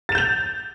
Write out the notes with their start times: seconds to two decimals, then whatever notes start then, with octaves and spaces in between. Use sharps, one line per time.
0.09 A6
0.12 E7
0.15 G6
0.18 F7